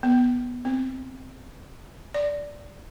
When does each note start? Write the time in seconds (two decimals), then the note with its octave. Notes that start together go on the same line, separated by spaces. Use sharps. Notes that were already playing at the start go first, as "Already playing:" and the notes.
0.03 B3
0.65 C4
2.14 D5